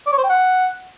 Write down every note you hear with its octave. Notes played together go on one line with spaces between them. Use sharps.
D5
C#5
C5
G5
F#5